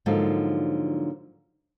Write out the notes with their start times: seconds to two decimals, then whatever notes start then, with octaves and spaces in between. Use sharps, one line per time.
0.06 G#2 D3 F3 F#3 A#3 D#4